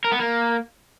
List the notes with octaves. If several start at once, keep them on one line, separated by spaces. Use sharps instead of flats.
A#4
B3
A#3